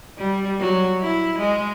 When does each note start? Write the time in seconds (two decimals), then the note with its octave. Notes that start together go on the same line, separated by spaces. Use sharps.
0.18 G3
0.59 F#3
1.02 E4
1.38 G#3